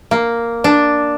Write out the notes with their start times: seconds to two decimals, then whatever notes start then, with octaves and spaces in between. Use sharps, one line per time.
0.11 A#3
0.64 D4